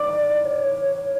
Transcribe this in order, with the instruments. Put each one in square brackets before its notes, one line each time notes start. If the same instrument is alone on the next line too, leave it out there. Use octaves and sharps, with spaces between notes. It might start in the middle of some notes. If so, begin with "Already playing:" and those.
Already playing: [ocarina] D5 [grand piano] D6
[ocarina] C#5